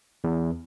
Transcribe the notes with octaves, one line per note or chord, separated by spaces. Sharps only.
E2